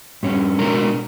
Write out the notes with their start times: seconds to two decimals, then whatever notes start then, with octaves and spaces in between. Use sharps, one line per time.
0.23 G2 C#4
0.59 B2 G#3 D4 F#4 A#4 A#5